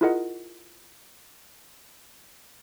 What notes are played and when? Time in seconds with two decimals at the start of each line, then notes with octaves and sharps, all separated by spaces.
0.01 E4 F4 G#4 A#4 D#5 F#5